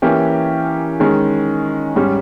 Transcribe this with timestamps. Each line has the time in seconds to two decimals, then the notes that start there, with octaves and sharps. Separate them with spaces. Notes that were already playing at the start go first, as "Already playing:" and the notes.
0.02 E3 A#3 C#4 G4
1.00 D#3 G#3 C#4
1.95 G#2 G3 C#4